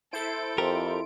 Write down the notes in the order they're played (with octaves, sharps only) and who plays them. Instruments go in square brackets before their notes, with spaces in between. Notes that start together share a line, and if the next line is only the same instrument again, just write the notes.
[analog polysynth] E4 C5 D7 [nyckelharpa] A4
[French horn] F2 [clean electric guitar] G4 A#4